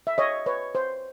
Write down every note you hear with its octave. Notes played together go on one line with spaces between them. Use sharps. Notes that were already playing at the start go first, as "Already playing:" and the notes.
E5
C#5 D#5
B4 C#5
C5